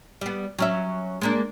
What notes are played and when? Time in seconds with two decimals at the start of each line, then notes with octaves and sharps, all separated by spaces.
0.21 G3 B3
0.58 F#3 C#4 E5
1.21 G#3 A#3 D4